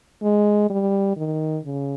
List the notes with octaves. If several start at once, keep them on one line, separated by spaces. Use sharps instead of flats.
G#3
G3
D#3
C#3